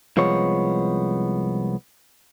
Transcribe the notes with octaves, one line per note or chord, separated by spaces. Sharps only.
C2 F3 G#3 B3 C#5